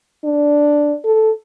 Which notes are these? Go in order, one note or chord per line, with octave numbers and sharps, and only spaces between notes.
D4
A4